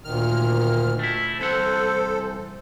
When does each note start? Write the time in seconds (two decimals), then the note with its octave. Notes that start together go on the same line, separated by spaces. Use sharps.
0.04 D2 A#2 D#3 F6
0.99 A3 E4
1.39 C2 E3 A4 C5 F#5